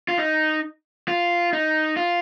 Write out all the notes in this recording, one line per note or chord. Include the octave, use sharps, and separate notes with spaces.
F4
D#4
F4
D#4
F4